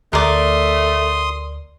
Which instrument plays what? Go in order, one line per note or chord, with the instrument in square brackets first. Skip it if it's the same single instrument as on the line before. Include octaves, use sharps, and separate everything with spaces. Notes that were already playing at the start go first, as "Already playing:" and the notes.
[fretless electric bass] D2 [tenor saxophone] A3 [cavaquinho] A#4 D5 [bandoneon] C6 D#6